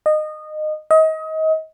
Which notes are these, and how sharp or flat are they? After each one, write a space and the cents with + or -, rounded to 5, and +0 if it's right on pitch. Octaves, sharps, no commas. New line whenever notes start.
D#5 -20
D#5 +30